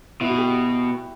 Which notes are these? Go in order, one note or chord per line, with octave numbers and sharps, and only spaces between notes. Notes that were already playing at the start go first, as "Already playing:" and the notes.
B2 E4
F#4
G4